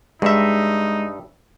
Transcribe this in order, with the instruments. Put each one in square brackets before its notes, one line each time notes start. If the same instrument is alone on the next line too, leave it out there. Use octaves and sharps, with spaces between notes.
[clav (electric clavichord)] G2 E5 [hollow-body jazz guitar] G#3 [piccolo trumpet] D#4